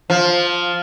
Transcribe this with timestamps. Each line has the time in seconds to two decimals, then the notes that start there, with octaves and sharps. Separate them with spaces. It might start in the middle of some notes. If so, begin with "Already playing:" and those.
0.10 F3